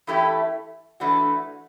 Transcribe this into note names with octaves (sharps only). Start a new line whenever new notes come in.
E3 A3 C#4 E4 G4
G#2 E3 A3 D4 F#4